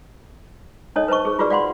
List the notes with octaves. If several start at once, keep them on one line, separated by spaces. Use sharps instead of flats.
D4 D#4 A4 C#5 D#5
B4 C5 D#5 A5 C#6
G#4
D#4 F4 F#4 G#4 B4 D5
D5 F5 F#5 B5 C6